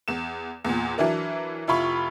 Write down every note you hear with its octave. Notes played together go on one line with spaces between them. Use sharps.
E2 E7
E2 A#2
E3 F#3 D4 E4 A#4
F1 E4 F4 B5 C#6